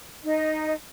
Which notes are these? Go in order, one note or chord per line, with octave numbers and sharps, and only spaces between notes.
D#4 D#5